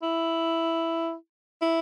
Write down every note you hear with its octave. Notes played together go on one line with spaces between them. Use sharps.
E4
E4